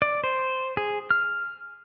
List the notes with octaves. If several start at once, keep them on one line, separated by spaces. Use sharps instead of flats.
D5
C5
G#4
F6